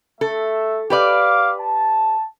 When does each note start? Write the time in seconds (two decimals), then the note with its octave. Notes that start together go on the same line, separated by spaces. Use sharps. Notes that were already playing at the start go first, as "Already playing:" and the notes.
0.21 A3 A4 E5
0.90 G4 B4 D5 F5 D6
1.60 A5